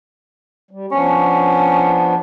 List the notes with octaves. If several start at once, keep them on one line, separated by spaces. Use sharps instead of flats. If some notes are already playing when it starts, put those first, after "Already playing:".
G3
F3 B3 C#4 D4